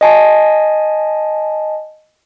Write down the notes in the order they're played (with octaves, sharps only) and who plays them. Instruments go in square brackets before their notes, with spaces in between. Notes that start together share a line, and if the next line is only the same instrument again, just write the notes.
[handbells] D#5 G#5 A5